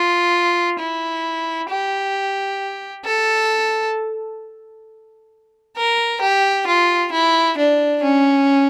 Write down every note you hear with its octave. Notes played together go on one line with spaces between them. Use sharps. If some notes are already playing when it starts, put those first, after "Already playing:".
Already playing: F4
E4
G4
A4
A#4
G4
F4
E4
D4
C#4